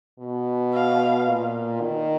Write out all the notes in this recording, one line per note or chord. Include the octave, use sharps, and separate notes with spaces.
B2
F5
A#2
D#3